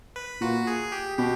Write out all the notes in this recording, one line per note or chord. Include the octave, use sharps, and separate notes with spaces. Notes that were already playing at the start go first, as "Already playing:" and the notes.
B4
A#2 F#4
G#4
G4
B2 G4